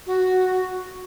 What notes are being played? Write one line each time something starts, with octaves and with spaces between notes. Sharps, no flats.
F#4